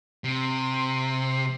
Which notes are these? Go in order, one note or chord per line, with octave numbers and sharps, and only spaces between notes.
C3